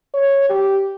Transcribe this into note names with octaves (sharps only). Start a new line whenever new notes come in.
C#5
G4